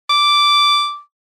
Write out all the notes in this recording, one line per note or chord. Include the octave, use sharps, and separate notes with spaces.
D6